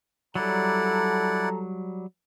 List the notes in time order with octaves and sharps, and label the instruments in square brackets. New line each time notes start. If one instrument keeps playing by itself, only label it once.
[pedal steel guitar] F#3 G3 [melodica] E4 D5 F#5 [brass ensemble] A4 A#5